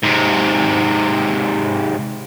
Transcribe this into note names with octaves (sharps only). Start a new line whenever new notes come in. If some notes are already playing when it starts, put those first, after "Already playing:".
G#2 C3